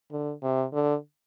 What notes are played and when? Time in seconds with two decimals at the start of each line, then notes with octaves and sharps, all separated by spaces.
0.11 D3
0.43 C3
0.73 D3